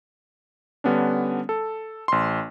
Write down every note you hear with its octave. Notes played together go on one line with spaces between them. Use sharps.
D3 G3 B3 C#4 D4
A4
A1 C6